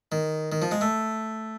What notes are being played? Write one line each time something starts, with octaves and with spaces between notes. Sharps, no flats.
D#3
D#3
F3
G#3
A3